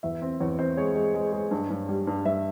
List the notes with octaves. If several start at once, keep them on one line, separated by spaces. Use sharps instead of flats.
E2 E5
C4
E2 C#5
C4 C5
G#3 C#5
G#3
G#3
G#3
G2
G2
G3
G2
G2 E5